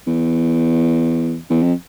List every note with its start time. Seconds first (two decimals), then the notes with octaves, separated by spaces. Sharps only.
0.07 E2
1.50 E2
1.63 F2